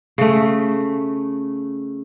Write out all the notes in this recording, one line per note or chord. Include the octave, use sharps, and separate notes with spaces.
C#3 A3